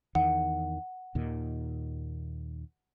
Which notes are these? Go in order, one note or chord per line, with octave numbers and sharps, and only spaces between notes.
E2 D#3 F#5
D#2 A#2 D#3